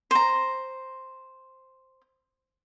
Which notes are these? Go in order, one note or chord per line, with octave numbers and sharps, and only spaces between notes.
C5 A#5